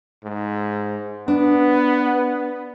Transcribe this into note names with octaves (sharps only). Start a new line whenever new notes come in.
G#2
B3 D4